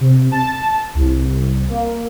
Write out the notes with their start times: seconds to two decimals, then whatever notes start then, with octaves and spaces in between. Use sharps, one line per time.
0.01 C3
0.31 A5
0.95 C2
1.69 A#3